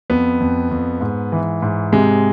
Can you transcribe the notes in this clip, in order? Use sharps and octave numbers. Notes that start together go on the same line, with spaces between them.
F2 B3
F2
F2
G#2
E3
G#2
C3 G#3